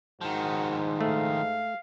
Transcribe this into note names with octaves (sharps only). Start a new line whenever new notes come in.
G#2 D#3 F3 F#4
A3 F5